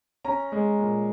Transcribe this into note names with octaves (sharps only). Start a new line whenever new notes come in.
C#4 A#5
G#3
A#2